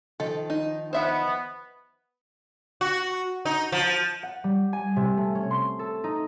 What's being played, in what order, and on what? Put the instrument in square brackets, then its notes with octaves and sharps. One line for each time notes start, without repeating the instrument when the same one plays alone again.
[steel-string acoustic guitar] D#3 F3 [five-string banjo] A4
[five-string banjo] D#4
[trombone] B3 [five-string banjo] C5 E5 F#5
[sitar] F#4
D#4
F3
[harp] F#5
G3
G#5
C3
A3
C#4
C6
A4
D#4